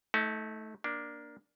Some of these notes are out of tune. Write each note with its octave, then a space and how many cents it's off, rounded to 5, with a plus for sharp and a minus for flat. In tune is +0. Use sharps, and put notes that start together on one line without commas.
A3 -10 D#4 +40
A#3 +15 D4 +0